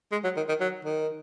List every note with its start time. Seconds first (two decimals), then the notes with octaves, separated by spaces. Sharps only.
0.12 G#3
0.24 F#3
0.37 D#3
0.48 D#3
0.60 F#3
0.85 D#3